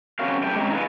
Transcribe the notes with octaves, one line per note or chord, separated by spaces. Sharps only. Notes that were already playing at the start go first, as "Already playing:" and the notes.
F#3 C4 C#4 F#4 A#4 F5
F#2 A2 G4 G5 A5
G#3 C4 C#4 A#5
D#4 F4 G#4 B4